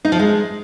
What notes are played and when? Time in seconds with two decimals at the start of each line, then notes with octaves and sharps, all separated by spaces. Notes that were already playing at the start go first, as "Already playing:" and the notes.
0.05 D#4
0.12 F3
0.19 G#3